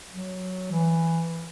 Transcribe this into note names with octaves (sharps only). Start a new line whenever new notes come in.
F#3
E3